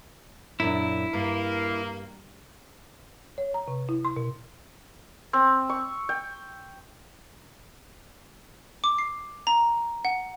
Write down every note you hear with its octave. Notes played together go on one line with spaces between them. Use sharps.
F#2 A#2 D4 E4
G2 A#3
C#5
A#5
C3
E4
C6
B2
C4
C#6
G5
D6
C7
A#5
F#5